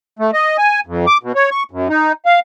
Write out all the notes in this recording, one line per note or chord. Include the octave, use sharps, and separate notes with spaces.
A3
D#5
G#5
F2
D6
B2
C#5
C#6
F#2
D#4
F5